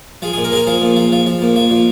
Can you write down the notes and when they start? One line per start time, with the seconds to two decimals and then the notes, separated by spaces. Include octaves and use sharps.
0.22 F3 G#4
0.33 G#4
0.38 A#2
0.44 A#4
0.52 F3 G#4
0.55 A#4
0.67 F3 G#4
0.82 A#2
0.96 F3
1.12 F3
1.26 F3
1.42 A#2
1.56 F3
1.71 A#2